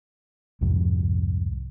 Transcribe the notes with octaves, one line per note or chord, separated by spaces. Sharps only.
C2 F2 G#2